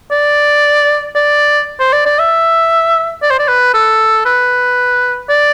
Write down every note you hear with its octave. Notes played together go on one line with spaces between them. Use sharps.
D5
D5
C5
D5
D5
E5
D5
C5
D5
B4
A4
B4
D5